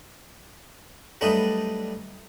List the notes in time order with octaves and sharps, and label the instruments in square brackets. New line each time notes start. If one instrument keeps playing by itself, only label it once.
[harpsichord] F#3 G3 A3 D4 B4 D#5